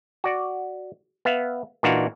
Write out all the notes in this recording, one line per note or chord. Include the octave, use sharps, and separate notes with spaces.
F#4 D5
B3 E5 F5
A#2 E3 D4 D#4 F#4 F5